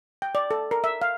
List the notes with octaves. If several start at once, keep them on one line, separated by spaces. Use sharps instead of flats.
G5
D5
A4
A#4
E5
F5